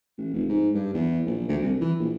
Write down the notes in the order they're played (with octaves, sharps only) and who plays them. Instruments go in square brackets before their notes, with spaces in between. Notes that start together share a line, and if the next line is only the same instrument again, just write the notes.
[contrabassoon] A1
F1
G#2
G2
E2
A#1
D2
C2
E3
A#1